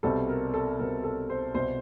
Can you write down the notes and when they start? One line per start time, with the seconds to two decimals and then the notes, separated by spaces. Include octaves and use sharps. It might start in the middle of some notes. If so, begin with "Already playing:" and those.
0.03 C2 B2 G3 C4 A4
0.29 A#4
0.54 A4
0.79 C2 B2 G3 C4 A#4
1.04 A4
1.30 C5
1.54 C2 B2 G3 C5